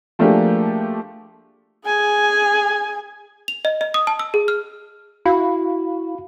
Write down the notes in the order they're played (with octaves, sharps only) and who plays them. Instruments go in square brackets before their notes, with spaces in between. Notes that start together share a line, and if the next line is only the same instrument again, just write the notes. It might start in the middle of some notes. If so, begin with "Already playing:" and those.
[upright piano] F3 A3 A#3 D4 G4 G#4
[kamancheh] G#4 G#5
[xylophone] F7
D#5
D#5
D#6
A5
E6
G#4
F6
[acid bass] E4 [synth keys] F#4 [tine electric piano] F5 B5